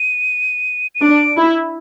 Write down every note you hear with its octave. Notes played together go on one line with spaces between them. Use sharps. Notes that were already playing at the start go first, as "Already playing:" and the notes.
Already playing: D#7
D#7
D4 D7
E4